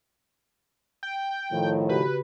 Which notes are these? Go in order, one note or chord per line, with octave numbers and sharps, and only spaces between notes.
G5
A2 D#3 F3
C#3 F#4 G4 B4